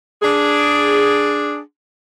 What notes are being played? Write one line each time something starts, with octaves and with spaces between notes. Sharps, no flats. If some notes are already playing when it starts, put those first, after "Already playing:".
D4 G#4